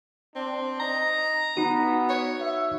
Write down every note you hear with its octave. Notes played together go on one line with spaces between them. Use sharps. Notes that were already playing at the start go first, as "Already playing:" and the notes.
C4 D4
D#4 A#5
B3 D#4 F#4
C#5
E5